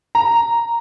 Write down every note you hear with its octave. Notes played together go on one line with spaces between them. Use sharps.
A#5